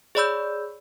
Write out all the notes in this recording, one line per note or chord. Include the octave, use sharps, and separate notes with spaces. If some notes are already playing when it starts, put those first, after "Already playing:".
G#4 C#5 D5 B5 E6 G6